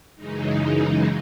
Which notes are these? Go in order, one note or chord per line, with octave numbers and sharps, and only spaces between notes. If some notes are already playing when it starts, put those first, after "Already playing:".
F#2 C#3 E3 G#3 D#4